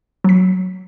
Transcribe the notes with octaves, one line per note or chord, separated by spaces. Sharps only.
F#3 B6